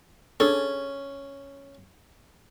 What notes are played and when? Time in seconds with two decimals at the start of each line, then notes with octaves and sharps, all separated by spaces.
0.40 C#4 D4 G#4 A4